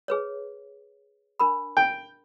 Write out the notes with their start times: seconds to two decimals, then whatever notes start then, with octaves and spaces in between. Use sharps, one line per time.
0.08 G#4 B4 C#5
1.40 D4 A#4 B5
1.77 G5